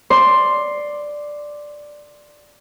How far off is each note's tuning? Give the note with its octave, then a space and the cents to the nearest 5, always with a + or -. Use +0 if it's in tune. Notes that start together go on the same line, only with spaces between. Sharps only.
D5 +5 C6 +5